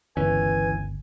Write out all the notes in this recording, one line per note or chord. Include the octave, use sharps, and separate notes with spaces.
G1 C#2 E3 C#4 B4 G#5